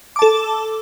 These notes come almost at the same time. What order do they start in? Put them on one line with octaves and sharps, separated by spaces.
D6 A5 A4